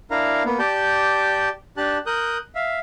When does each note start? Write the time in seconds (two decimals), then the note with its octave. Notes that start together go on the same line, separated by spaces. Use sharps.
0.11 D4 E4 A#4 F5 A#5
0.45 A#3 B3
0.59 G4 D5 A5 G6
1.77 D4 G4 A5 F#6
2.06 A#4 D#6 F#6 G6
2.55 E5 F5